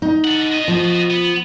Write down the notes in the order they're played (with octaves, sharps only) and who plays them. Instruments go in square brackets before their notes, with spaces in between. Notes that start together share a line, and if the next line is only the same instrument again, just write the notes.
[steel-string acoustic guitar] D#4
[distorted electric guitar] A4 F#5
F#4 D#5
[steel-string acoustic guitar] F3
[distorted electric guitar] B3